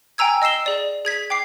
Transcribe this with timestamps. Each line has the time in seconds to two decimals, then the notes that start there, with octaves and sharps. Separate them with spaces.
0.18 G5 G#5 A#5 E6 G#6
0.42 D#5 E6 C7 E7 G7
0.66 G#4 D5
1.05 G#4 G#6 B6
1.30 G5 D6 C7